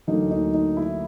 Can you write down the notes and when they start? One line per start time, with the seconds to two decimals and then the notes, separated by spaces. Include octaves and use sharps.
0.07 D2 D3 F#3 A#3 D#4
0.31 D#4
0.54 D#4
0.77 E4